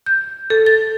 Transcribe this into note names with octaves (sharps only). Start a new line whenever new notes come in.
G6
A4
A6